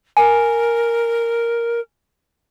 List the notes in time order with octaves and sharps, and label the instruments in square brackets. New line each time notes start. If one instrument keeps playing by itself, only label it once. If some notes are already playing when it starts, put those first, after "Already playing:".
[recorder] A#4 [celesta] G#5